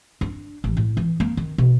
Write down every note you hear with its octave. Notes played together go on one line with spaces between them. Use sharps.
D4
A1
A2
E3
A#3
D#3
B2